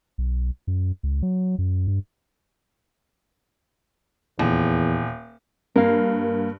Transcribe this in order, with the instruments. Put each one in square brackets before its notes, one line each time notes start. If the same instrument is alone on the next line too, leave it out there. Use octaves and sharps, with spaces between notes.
[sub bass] B1
F#2
C#2
F#3
F#2
G2
[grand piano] D#1 [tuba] E2
[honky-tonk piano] G2 [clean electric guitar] A#3 [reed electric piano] A#4 F5